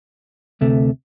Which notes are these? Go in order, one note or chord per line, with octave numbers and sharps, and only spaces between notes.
D2 C3 A3